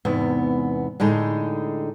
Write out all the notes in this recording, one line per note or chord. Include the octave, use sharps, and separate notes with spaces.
E2 G#2 C3 B3
A2 D3 G#3 D#4